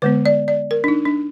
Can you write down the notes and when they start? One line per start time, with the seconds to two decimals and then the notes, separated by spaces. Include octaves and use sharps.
0.02 D3 G#3 B3 B4
0.26 D5
0.48 D5
0.71 A#4
0.84 D4
0.88 D#4
1.06 D4